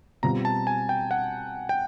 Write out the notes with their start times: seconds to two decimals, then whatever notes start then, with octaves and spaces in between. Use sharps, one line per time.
0.23 B2 G3 C4 F4 A#5
0.45 A5
0.67 G#5
0.89 G5
1.11 F#5
1.69 G5